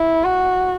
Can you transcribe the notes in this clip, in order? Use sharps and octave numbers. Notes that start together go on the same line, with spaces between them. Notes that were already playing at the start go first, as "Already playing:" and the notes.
Already playing: E4
F#4